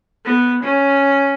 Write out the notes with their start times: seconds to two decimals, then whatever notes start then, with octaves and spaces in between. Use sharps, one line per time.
0.25 B3
0.63 C#4